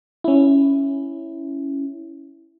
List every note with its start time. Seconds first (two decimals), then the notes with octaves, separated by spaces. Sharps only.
0.24 C#4 E4